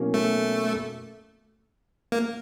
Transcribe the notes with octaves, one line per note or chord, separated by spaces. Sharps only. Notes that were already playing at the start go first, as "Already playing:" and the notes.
Already playing: B2 F#3 A#3 C#4 E4
A3
A#3